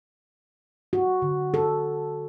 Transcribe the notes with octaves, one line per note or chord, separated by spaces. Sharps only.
F#4
D3
A4